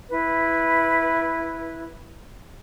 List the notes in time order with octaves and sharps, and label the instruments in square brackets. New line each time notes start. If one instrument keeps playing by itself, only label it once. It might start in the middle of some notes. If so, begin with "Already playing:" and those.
[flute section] E4 B4